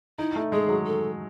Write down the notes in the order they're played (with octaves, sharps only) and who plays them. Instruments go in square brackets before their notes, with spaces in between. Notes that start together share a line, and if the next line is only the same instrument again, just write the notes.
[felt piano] D#4 [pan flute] E4
[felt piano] A3
[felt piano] G#3 [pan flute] G#4
[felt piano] F#3
[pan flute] A4